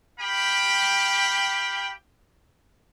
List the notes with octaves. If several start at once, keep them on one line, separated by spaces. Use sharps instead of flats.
G4 F5 G5 B5